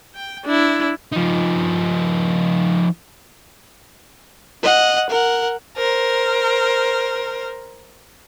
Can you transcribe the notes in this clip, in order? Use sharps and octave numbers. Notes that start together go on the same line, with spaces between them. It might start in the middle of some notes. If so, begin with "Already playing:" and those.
G5
D4 E4
F3 D#4
D#5 F#5
A#4 F#5
A#4 C5